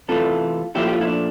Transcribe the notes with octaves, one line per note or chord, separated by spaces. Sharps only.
E2 C3 E3 A3 F4 A4
A#2 F3 A3 E4 G4
G4
F4
E4
D4